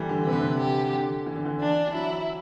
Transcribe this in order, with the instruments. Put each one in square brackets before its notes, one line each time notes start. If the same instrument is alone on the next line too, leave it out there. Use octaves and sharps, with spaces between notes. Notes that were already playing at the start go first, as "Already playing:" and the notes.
Already playing: [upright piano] E3 G3 A3
D3
[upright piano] C3 [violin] B4
[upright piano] D3
C3
[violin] G4
[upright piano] D3
E3
D3
E3
[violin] D4
[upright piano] E3
[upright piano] F#3 [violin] E4